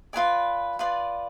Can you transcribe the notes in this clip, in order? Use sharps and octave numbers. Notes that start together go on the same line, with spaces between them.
F4 B4 D5 G#5
F4 B4 D5